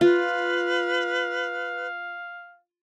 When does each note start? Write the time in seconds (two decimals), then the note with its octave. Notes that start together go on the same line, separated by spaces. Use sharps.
0.01 F4 B4 F5